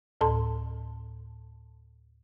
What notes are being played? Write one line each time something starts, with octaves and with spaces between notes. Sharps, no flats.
D2 A2 A4 A5 C6